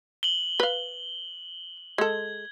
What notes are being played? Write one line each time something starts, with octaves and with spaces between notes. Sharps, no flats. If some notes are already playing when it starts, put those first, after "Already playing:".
F#7 G7
B4 F5
G#3 A4 G#6